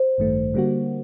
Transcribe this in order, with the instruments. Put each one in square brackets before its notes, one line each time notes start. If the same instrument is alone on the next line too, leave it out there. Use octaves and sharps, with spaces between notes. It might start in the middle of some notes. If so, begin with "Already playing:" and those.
Already playing: [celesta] C5
[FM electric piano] A1 G2 D#3 A3
D3 G3 A#3 F#4